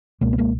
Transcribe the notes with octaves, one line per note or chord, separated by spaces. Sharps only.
C#2 B2 G#3 A#3
B3
G#3 A#3